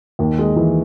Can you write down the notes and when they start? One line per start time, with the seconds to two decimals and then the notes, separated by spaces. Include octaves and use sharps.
0.19 D#2
0.38 G#3
0.56 E3